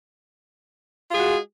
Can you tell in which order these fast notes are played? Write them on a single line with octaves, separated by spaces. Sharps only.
F4 G#4 G#3 F#4